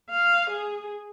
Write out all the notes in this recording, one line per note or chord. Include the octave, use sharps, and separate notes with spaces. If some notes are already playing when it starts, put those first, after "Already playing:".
F5
G#4